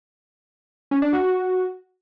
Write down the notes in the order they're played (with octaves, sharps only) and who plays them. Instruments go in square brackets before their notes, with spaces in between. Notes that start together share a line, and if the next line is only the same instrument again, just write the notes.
[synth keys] C#4
D4
F#4